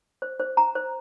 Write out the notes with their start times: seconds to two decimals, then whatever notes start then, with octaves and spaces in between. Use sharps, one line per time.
0.22 C5
0.39 C5
0.57 A#5
0.75 C5